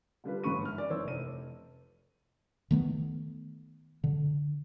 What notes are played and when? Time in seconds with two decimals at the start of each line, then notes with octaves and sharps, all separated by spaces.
0.24 D3 G3 F4 B4
0.44 G1 G#2 B5 C#6 D#7
0.65 F6
0.78 D5
0.90 G1 D#3 E3 C5 C#5 E6
1.04 F1 D#7
2.71 D#3 A3 B3
4.04 D3